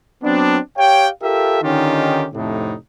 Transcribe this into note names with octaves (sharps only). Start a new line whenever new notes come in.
F#3 B3 C4 D4
G4 C#5 F5 G5
F4 G4 A4 A#4 E5
D3 D#3 C#4 D#4 F4 G4
F2 A2 C3 A3 D4 D#4